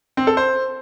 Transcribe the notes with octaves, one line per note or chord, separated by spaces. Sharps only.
C4
A4
C5